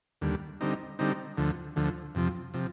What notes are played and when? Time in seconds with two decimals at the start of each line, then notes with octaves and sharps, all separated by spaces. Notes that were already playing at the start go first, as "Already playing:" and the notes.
0.22 D#2 D3 G3
0.61 D3 G3 C4 D#4
0.99 D3 G3 C4 D#4
1.38 D2 D3 F3
1.76 D2 D3 F3
2.15 F2 C3 F3
2.54 C3 F3